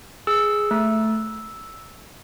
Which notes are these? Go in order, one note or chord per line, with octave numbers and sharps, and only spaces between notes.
G#4 E6
A3